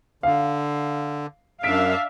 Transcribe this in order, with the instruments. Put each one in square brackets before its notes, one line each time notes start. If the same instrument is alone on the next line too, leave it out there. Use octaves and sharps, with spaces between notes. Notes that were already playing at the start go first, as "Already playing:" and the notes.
[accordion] D3 [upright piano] F5
[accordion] F#2 [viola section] D4 E5 F5 [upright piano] B6 D7